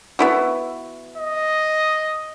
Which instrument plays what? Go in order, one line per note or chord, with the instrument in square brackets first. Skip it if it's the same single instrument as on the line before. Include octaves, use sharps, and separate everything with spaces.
[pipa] B3 E4 F#4
[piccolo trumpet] D#5